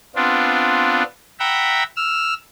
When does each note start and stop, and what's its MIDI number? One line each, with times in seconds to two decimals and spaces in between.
0.15 1.03 59
0.15 1.03 60
0.15 1.03 62
0.15 1.03 65
1.40 1.83 76
1.40 1.83 78
1.40 1.83 79
1.40 1.83 82
1.40 1.83 83
1.96 2.34 88
1.96 2.34 89